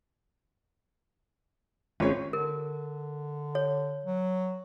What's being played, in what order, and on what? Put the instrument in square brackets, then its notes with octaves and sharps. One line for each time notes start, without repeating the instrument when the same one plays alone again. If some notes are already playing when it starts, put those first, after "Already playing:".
[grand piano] G#1 C#5 [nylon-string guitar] G#3 C#4 F4
[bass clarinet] D3 [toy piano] A#4
[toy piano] C#5
[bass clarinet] F#3